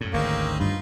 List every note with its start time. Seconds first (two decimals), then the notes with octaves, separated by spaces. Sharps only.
0.01 F#2 A2
0.13 G#1 D2 A#3 C4 C#4 D#4
0.60 G2 D#4 F4 B5